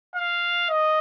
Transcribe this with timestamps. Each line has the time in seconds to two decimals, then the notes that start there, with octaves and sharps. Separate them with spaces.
0.16 F5
0.70 D#5